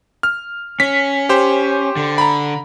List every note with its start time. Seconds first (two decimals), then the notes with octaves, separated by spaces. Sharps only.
0.23 F6
0.80 C#4 B6
1.29 G4 C5
1.96 D3
2.18 A#5 B5